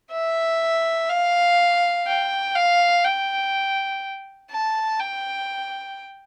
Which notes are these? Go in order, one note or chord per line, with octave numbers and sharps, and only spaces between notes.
E5
F5
G5
F5
G5
A5
G5